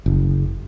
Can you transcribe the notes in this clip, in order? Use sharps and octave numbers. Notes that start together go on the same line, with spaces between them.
F#1